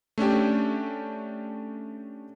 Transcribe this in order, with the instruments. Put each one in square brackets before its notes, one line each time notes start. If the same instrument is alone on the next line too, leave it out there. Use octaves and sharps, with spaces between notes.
[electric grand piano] A3 C#4 D4 G4